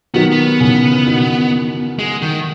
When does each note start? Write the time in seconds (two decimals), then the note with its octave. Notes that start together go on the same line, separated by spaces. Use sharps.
0.14 D#3 F#3 B3
0.32 B3
0.60 C#3 E3
1.06 B2 D#3
1.99 G#3
2.22 D#3